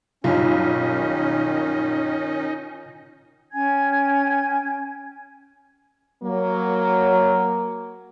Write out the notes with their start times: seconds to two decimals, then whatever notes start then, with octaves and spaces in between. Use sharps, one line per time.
0.24 B1 G2 D#3 C#4 D#4 F4
3.52 C#4 G5 G#5 G#6
6.23 F#3 A#3